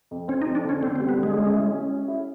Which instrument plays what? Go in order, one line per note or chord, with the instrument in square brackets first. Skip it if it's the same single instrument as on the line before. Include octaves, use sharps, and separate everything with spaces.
[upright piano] F2
[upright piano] C4 [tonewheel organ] C#4
[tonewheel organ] D#4
[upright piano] F2
[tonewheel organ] D4
[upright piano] D3 [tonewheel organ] C#4
[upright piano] D3 [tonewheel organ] C4
[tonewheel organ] C4
[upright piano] G3
[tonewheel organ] B3
[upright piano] D3
[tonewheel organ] G#3
[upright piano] C#4
E4
C#4
C#4
E4